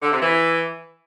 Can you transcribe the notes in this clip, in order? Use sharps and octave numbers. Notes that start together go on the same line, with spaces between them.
D3
C3
E3